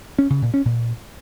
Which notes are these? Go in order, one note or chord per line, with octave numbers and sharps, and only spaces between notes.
C#4
C#3
A#2
C#4
A#2